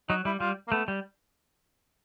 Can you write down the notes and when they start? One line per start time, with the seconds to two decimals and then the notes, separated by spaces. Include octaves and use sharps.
0.09 F#3 D#4
0.25 G3 E4
0.40 G3 F4
0.68 A#3
0.72 A3 B3
0.88 G3